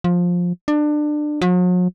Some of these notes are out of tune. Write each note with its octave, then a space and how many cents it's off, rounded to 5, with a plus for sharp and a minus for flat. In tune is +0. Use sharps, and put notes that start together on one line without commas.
F3 +15
D4 +25
F#3 -45